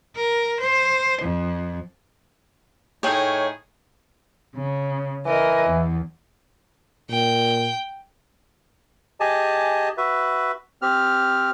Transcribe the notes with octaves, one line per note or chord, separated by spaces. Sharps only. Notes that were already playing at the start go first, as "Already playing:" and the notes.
A#4
C5
F2
A2 D#4 G#4 C#5 G5
C#3
E3 A#4 D#5
E2
A#2 G5
G4 G#4 D#5 G#5 A5
F#4 B4 E5
C4 G4 F6